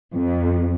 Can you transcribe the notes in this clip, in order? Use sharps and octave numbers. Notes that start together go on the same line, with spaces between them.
F2